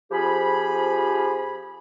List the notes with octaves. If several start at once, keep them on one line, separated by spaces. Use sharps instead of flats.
F2 F3 G4 G#4 G#5 B5